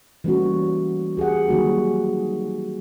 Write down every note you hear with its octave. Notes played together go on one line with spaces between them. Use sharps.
E3 G3 A3 A#3 C#4 F#4
G4 G#4 A#4 F#5
D#3 F#3 G3 A#3 F#4 G#4